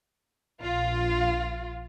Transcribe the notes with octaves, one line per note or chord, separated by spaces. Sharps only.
A#1 F4